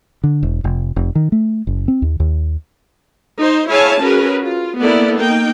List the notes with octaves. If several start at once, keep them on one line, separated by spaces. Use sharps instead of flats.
D3
E1
F1
F1
D#3
A3
F#1
C4
D#2
D#2
D#4 C5
E4 G#4 C#5 F5 G#5 A5
C#4 F#4 G#4 A#4 B4
F4
A#3 B3 E4 A4 D5
A#3 D#4 G5